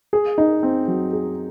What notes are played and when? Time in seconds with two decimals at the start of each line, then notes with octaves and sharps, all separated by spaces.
0.13 G#4
0.38 D#4
0.63 C4
0.88 F#3
1.13 G#4